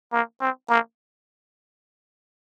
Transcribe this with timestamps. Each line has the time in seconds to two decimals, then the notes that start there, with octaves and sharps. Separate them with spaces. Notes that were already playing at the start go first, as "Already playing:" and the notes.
0.13 A#3
0.41 C4
0.69 A#3